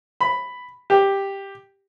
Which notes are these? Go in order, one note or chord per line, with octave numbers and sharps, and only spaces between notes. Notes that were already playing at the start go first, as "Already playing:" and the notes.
B5
G4